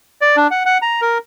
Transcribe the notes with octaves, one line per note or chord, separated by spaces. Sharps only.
D5
D4
F#5
F#5
A#5
A#4